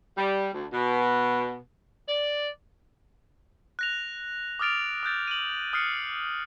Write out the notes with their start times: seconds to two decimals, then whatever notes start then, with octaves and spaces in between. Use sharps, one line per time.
0.17 G3
0.53 D2
0.71 B2
2.08 D5
3.79 F#6 A#6 F7
4.59 D6 D#6 F6 A6 D7 F7
5.03 D#6 F#6 G6 A6
5.27 D#7 F#7
5.73 D#6 F6 F#6 C7 C#7